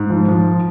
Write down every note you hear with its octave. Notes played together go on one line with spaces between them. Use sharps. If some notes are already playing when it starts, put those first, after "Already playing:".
Already playing: G#2
F3
F3